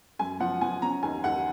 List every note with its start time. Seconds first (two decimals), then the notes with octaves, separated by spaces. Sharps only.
0.19 F#2 G#5
0.40 F3 F#5
0.61 F3 G#5
0.82 C#4 A#5
1.03 D#2 G#5
1.24 D#2 F#5